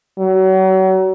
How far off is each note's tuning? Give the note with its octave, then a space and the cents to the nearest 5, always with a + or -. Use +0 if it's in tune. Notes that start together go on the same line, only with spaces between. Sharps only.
F#3 +35